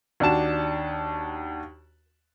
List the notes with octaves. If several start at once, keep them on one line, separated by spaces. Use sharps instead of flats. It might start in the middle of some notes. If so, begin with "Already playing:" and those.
D#2 D4 F#4 A5 E7